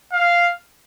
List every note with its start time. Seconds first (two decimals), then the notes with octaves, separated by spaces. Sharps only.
0.12 F5